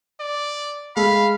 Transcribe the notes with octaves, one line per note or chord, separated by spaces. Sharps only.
D5
G#3 A3 A4 F5 B5